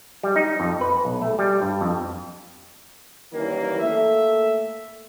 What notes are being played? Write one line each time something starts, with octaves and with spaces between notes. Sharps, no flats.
G3
D#4
F2
B4
B1
A3
G3
G2
F2
F#2 D#3 E3 G3 A#3
A3 A#3 E5